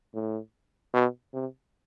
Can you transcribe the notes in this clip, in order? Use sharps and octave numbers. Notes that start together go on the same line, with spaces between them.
A2
B2
C3